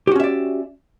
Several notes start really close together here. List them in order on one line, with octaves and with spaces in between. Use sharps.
G4 F#4 C#4 E5 D5